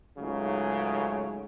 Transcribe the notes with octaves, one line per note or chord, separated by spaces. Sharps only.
C#2 G#2 C#3 F#3 A3